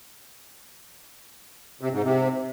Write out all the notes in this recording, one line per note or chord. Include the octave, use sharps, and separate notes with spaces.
C3
G#2
C3